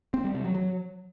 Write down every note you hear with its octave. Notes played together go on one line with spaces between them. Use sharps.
C4
G3
C3
F#3
F#3